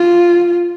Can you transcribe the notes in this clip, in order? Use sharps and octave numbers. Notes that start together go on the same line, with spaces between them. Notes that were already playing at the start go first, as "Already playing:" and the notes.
Already playing: F4